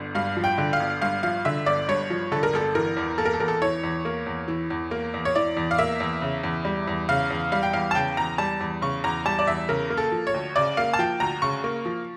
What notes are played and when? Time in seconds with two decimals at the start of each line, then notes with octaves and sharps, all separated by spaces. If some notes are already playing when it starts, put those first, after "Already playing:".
Already playing: G1 D3
0.15 G2 F5
0.37 F3
0.44 G5
0.58 D3
0.73 F5
0.80 G1
1.01 G2 F5
1.23 F3 F5
1.45 D3 E5
1.66 G1 D5
1.88 G2 C#5
2.10 F3
2.32 D3 A4
2.43 A#4
2.53 G1 A4
2.75 E3 A#4
2.97 E2
3.18 A#3 A4
3.25 A#4
3.33 A4
3.40 E2 A#4
3.48 A4
3.62 E3 C#5
3.84 E2
4.05 A#3
4.26 E2
4.48 E3
4.70 E2
4.91 A#3
5.14 E2
5.25 C#5
5.36 E3 D5
5.57 E2
5.71 F5
5.78 A#3 E5
6.00 E2
6.22 C#3
6.44 E2
6.65 G3
6.88 E2
7.09 C#3 F5
7.30 E2
7.52 G3 F5
7.63 G5
7.73 E2 F5
7.91 A5
7.95 C#3 G5
8.17 E2 A#5
8.38 G3 A5
8.61 E2
8.82 C#3 C#6
9.04 E2 A#5
9.25 G3 A5
9.39 D5
9.47 E2 E5
9.69 C#3 A#4
9.90 A#3
9.97 A4
10.12 F3
10.27 C#5
10.34 D2
10.56 C#3 D5
10.77 A#3 F5
10.93 A5
10.99 F3 G5
11.20 D2 A#5
11.42 C#3 C#6
11.64 A#3
11.85 F3